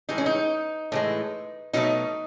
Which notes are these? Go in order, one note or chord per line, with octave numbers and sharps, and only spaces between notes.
A2 E3 G#3 D#4
C#4
D#4
A2 E3 G#3
B2 F#3 A3 D#4